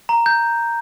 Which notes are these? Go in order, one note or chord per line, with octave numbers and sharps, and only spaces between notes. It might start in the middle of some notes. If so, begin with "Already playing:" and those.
A#5
G6